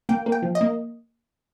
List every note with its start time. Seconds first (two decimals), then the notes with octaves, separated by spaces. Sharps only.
0.09 A#3 G5
0.26 A#3
0.32 G5
0.42 F3
0.55 D#5
0.61 A#3